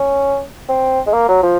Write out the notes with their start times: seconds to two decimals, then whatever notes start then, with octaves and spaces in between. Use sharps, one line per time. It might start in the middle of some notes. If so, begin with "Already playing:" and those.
Already playing: C#4
0.69 C4
1.07 G#3
1.13 A#3
1.28 F#3
1.43 F3